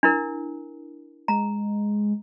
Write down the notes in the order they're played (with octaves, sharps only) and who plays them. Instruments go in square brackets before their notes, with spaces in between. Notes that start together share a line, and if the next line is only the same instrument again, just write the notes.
[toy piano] D4 E4 A#4
[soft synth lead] G#3 [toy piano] A#5